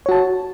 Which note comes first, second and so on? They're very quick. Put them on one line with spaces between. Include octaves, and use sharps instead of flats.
C#5 F#4 A5